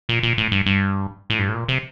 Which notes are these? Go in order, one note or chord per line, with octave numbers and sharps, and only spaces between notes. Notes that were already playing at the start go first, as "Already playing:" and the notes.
A#2
A#2
A2
G2
G2
A2
G2
A2
A#2
C3